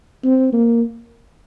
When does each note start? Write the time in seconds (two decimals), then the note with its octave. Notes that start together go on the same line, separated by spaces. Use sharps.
0.24 C4
0.52 A#3